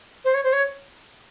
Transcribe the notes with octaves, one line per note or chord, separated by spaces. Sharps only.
C5
C#5
C5
C#5